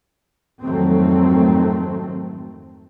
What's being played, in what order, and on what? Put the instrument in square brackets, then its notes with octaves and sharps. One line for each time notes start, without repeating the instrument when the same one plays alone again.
[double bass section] F2 G#2 D#3 F#3 A3 C4